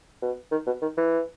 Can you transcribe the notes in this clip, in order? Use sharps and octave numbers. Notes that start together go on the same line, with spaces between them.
B2
D#3
B2
D#3
E3